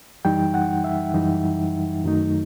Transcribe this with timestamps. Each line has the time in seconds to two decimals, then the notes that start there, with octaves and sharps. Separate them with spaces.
0.25 F#2 E3 G3 D#4 G5
0.54 F#5
0.84 E5
1.14 F#2 E3 G3 D#4
2.04 F#2 D#3 F#3 A3 D#4